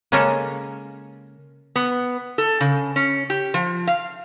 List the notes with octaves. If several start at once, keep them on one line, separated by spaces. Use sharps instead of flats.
C#3 G#3 A#3 C#4 A4
B3
A4
C#3
C#4
G4
F3
F5